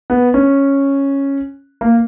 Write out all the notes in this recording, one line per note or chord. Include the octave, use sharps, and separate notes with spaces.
B3
C#4
A#3